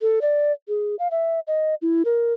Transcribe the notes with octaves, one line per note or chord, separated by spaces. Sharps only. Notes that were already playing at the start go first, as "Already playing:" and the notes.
A4
D5
G#4
F5
E5
D#5
E4
A#4